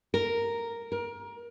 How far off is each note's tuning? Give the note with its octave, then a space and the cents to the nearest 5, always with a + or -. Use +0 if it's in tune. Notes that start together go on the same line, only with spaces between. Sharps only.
A#4 -5
A#4 +25